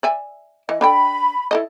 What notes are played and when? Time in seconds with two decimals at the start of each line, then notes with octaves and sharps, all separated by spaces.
0.03 D5 E5 G#5
0.69 E3 D#5
0.81 D4 A4 G5 B5
1.51 E4 A4 D#5